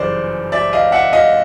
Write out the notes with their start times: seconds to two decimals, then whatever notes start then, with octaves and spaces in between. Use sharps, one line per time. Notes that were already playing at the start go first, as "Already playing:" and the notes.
Already playing: G1 F#2 C#3 E3 G3 C5 D5
0.52 D5 E5
0.73 D#5 F5
0.92 E5 F#5
1.13 D#5 F5